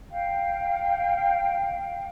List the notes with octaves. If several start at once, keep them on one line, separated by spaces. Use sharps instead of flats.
F5 G5